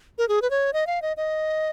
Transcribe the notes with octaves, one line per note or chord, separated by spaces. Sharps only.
A#4
G#4
B4
C#5
D#5
F5
D#5
D#5